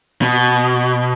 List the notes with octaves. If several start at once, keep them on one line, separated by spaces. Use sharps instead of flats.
B2